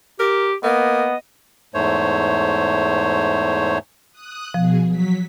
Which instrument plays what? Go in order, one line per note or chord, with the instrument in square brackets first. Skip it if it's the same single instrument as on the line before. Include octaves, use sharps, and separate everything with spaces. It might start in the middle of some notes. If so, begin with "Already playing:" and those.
[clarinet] G4 [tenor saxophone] A#4
[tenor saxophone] A#3 [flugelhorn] B3 [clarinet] D#5
[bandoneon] E2 G#2 A3 C5 C#5
[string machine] D#6 F#6
[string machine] B2 G#4 [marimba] F3
[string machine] F#3 B6